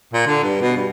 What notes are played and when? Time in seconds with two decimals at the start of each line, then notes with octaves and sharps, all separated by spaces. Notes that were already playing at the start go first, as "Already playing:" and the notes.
0.14 A#2
0.27 D3
0.43 G2
0.61 B2
0.77 G2